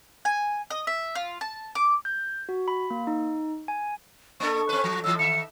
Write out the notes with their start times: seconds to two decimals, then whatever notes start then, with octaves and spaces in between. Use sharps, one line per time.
0.25 G#5
0.70 D#5
0.87 E5
1.15 F4
1.41 A5
1.75 D6
2.05 G6
2.49 F#4
2.68 B5
2.90 A#3
3.07 D#4
3.68 G#5
4.40 A#3 D4 A4 C#6
4.69 C4 B4
4.84 F3
5.04 A2 E3 E6
5.19 D#3 E5 C#7